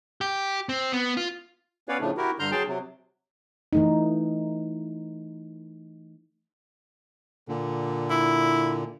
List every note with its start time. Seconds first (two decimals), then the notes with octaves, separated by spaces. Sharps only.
0.21 G4
0.69 C4
0.93 B3
1.17 F4
1.89 B3 C#4 B4 C#5 D5 F5
2.01 A2 C#3 F3 A3 D4
2.17 E4 F#4 G4 A#4
2.39 G2 D3 A#5 C6 F6 G6
2.52 F#3 G#4 G5 A5 C6
2.67 C3 F#3
3.73 E3 A3 D#4
7.48 A#2 D3
8.10 E4